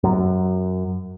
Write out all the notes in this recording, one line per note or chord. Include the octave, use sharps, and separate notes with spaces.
F#2